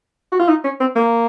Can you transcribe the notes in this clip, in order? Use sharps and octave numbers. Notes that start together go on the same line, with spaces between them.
F#4
F4
D#4
C#4
C4
A#3